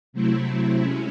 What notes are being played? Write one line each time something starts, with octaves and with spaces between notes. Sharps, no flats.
C3 F#3 A3 C4 E4
G#3 C#4 E4